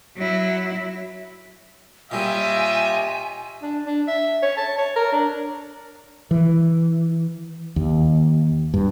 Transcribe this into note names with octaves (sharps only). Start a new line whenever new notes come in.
F#3 E4
A#2 G3 F4 G4 C#5 D#5 E5 G#5
D4
D4
E5
C#5
A5
C#5
A#4
D4
E3
D#2
G2